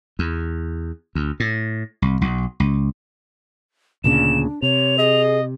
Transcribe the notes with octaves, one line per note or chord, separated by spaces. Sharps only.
E2
D2
A2
C2
B1
C#2
D2 A#2 C#3 D4 E7
C3 C#5 F7
G#4 D#5